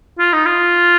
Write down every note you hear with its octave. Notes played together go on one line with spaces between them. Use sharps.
F4
D#4
F4